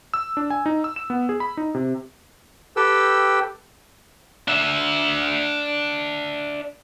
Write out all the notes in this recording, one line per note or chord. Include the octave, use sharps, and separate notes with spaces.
E6
D4
G#5
D#4
E6
E7
B3
G#4
B5
D#4
C3
G4 A4 B4 G5 E6
D4 E5